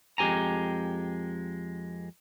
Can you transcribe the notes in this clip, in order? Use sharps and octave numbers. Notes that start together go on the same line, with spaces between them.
F2 G#3 G4 G#5 A#5